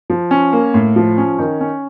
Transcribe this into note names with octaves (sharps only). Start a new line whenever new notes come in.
F3
C#4
A#3
A2
F3
C#4
D#3
C#4